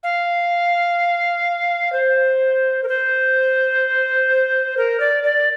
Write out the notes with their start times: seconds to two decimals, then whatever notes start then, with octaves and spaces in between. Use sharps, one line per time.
0.03 F5
1.92 C5
2.83 A#4
2.88 C5
4.77 A#4
5.00 D5
5.24 D5